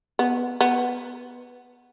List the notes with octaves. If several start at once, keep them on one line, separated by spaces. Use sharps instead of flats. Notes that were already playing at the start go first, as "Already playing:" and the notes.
B3
B3